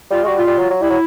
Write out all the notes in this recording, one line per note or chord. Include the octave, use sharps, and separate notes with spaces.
G3 F4
G3 G#3 F#4
F4
G3
F#3
F#3
G3 E4
F#3